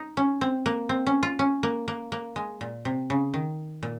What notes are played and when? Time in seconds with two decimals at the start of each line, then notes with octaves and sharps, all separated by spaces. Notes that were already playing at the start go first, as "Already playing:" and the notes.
Already playing: D#4
0.17 C#4
0.41 C4
0.66 A#3
0.89 C4
1.07 C#4
1.23 F4
1.39 C#4
1.63 A#3
1.88 A#3
2.12 A#3
2.36 G#3
2.61 A#2
2.85 C3
3.10 C#3
3.34 D#3
3.83 A#2